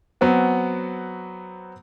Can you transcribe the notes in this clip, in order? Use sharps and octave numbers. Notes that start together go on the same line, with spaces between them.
F#3 B3 C4 F#4